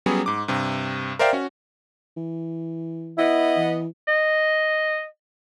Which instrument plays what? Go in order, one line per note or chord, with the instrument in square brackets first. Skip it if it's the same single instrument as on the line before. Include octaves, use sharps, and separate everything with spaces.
[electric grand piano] F#3 G3 B3 C#4 G#4
G#2 D6
G2 C3
A#4 C5 D5 E5 F5 G5
C#4 F#4
[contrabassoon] E3
[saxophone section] B3 D#5 [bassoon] E4
[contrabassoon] E3
[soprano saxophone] D#5